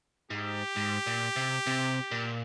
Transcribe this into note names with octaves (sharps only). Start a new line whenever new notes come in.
G#2 G4
G#2
A#2
C3
C3
A#2